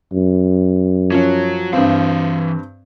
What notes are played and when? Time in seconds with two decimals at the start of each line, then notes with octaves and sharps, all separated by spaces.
0.12 F#2
1.12 F3 F#3 C#4
1.73 G2 E3 C4 F5